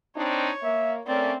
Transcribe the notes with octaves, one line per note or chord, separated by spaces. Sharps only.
C4 D4 D#4 C#5
A#3 E5
A3 A#3 C4 C#4 D5